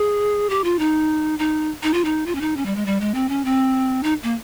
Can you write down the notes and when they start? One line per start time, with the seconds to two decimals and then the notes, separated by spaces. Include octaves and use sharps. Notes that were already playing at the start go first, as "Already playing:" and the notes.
Already playing: G#4
0.50 G4
0.64 F4
0.79 D#4
1.39 D#4
1.83 D#4
1.94 F4
2.05 D#4
2.26 F4
2.35 C#4
2.41 D#4
2.57 C#4
2.66 G3
2.76 G#3
2.86 G3
3.00 G#3
3.14 C4
3.29 C#4
3.45 C4
4.03 D#4
4.23 A#3